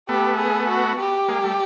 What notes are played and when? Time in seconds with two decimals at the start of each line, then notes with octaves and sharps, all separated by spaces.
0.09 A3 B3 G4
0.38 G#4
0.68 F#4
0.99 G4
1.28 G#3 A#3
1.44 G3 A3